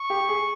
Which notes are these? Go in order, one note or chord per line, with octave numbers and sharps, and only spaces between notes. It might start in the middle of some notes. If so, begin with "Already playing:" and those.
Already playing: C#6
G4
G#4